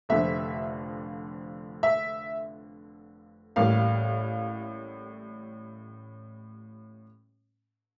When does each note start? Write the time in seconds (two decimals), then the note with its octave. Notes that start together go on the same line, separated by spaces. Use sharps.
0.09 F1 F2 D3 F3 E5
1.83 E5
3.56 A1 A2 G3 A#3 F5